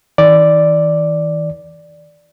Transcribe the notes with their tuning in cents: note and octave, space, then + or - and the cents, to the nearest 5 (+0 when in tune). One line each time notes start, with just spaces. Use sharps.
D#3 +45 D5 +0